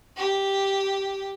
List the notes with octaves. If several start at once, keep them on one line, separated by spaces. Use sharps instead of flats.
G4